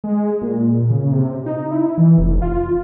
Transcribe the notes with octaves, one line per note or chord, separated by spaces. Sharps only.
G#3
A#2
C#3
C3
D#4
E4
E3
F1
F4